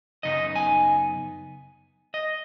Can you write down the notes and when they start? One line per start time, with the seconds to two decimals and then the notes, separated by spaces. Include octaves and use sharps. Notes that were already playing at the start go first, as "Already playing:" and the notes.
0.23 F#2 C#3 B3 D#4 D#5
0.56 G#5
2.14 D#5